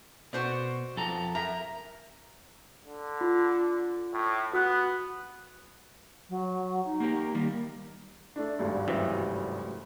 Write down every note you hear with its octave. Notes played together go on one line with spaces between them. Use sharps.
B2 F#4 C5 D5
F2 A4 A#5
F#2 A#4 E5 A#5
D3
F4
A2
B3 F#4 D#6 F#6
F#3
D#4
A#3 G4 A#4
D#3 G3 A#3
A3 D4
G#1 D2 G2
F#2 C3 E3